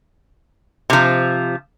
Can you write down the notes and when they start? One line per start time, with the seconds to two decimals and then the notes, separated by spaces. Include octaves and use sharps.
0.90 C3 F3